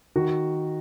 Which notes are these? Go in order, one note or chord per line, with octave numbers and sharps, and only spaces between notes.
D#3 F#4